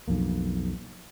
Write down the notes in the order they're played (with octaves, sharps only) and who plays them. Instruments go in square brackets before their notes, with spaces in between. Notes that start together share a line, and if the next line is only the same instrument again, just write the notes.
[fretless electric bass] B1 F2 A#3